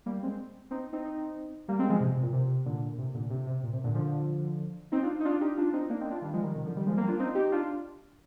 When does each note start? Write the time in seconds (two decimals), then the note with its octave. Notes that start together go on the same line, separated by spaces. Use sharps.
0.06 G3 A#3
0.23 G#3 C4
0.71 C4 D#4
0.93 C4 D#4
1.68 G3 A#3
1.79 G#3 C4
1.89 F3 G#3
2.00 C3
2.12 C3
2.22 A#2
2.33 C3
2.66 A#2 D3
2.94 A#2
2.98 C3
3.14 A#2 D3
3.30 C3
3.47 C3
3.63 A#2
3.73 C3
3.84 A#2 D3
3.95 D3 F3
4.92 C4 D#4
5.03 D4 F4
5.20 D#4
5.25 D4 F4
5.41 D#4 G4
5.57 D4 F4
5.73 C4 D#4
5.90 A#3 D4
6.00 C4 D#4
6.11 D4 F4
6.22 D#3 G3
6.33 F3 G#3
6.43 D#3 G3
6.54 C3 D#3
6.65 D3 F3
6.76 D#3 G3
6.86 F3 G#3
6.97 G3 A#3
7.08 D4 F4
7.19 C4 D#4
7.35 D#4 G4
7.52 D4 F4